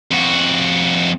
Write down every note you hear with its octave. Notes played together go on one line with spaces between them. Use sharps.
F2 F#4